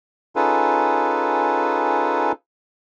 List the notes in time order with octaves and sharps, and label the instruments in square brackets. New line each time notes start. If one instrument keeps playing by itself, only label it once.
[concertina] C#4 D#4 F4 G#4 A4 B4